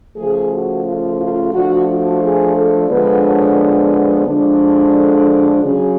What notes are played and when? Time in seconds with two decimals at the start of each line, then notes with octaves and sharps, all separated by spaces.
0.16 C#3 F3 A3 G#4
0.50 F#4
0.85 F4
1.19 F4
1.53 F3 A3 D4 F#4
1.88 F#4
2.21 G#4
2.56 A4
2.90 D3 F3 G#3 B3 D4 B4
3.24 C#5
4.27 D3 F3 G#3 D4
4.95 A4
5.63 C#3 F#3 C#4 G#4